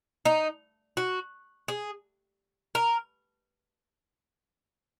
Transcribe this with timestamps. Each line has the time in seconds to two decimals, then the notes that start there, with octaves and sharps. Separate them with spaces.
0.25 D#4
0.97 F#4
1.68 G#4
2.75 A#4